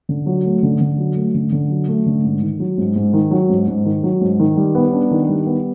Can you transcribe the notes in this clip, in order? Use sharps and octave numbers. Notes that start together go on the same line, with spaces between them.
D3
F#3
A3
D3
D3
F#3
A3
D3
D3
F#3
A3
D3
G#2
D#3
F#3
G#2
G#2
D#3
F#3
G#2
G#2
D#3
F#3
G#2
D#3
G3
B3
D4
D#3
G3
B3